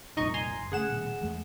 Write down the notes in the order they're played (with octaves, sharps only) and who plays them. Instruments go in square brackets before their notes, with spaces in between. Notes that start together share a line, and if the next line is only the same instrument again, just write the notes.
[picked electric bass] F1 C2 A#2 [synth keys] D#4 D#5 C#6
[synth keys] G#5 A#5 C6
[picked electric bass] F#1
[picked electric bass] C#3 A3 [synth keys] G#4 F#5 E7
[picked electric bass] D#1 B2
E2 G#3 A3